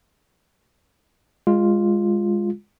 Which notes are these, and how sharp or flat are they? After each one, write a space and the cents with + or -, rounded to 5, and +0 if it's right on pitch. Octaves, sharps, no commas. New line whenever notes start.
G#3 -15 F4 +0